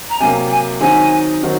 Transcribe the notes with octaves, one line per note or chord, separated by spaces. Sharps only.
A#5
C3 F#3 A#3 G#5
G#5
D#3 F#3 C4 D#4 F#4 G#5
D#3 F#3 C4 D#4 F#4